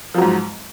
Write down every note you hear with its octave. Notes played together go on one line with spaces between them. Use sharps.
G#2 F3 F#3